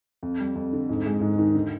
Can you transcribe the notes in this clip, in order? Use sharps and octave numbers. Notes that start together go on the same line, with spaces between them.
F2
G3
F2
D3
G#2
G#3
G#2
D#3
D3